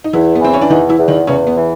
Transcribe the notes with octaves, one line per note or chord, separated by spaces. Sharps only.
D#4
E2 E3 E4
B3
E3 C4
C#4
D4
E2 D#3 D#4
E3 E4
E2
D#3 D#4
E2 C#3 C#4
B3
E3